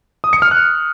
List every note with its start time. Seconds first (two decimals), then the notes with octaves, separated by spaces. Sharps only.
0.24 D#6
0.33 C#7
0.42 F6
0.51 F#6